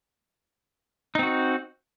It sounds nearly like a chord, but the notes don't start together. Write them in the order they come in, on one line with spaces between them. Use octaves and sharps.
D#4 C4 F#4